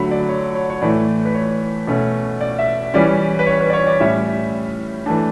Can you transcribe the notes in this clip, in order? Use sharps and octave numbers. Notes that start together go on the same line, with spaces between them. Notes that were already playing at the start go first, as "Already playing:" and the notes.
Already playing: D3 F#3 A3 B5
D5
C#5
C#5
C#5
A2 E3 A3 D5
B4
C#5
B2 A3 C#4
D5
E5
E3 G3 C#4 D5
B4
C#5
B4
D5
C#5
D5
A2 G3 C#4 E5
E3 A3 D4 A5